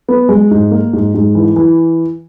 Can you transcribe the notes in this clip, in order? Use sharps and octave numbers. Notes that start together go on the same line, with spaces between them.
B3
G#3
G#2
A#3
G#2
G#2
E3
E3